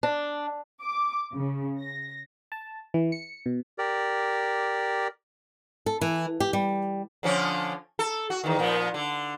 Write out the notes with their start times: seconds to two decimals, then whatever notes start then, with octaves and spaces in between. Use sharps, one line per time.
0.03 D4
0.82 D6
1.34 C#3
1.80 A#6
2.52 A5
2.94 E3
3.12 C#7
3.46 B2
3.78 G4 A#4 D5
5.86 A4
6.01 E3
6.40 G4
6.53 G3
7.23 D3 F3 C#4
7.99 A4
8.30 F#4
8.44 E2 D#3
8.59 A#2 F3 B3
8.94 D3